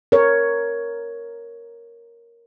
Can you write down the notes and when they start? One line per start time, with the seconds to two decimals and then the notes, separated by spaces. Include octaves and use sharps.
0.12 A#4 C#5